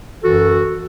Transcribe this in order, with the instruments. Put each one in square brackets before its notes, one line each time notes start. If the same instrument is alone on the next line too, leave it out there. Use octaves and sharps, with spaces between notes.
[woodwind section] F#2 E3 F#4 A4